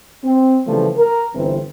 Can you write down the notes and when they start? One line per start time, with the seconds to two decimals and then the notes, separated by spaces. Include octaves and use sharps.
0.24 C4
0.66 C#3 E3 F3 G3 A3
0.97 A#4
1.35 G1 G2 E3 C4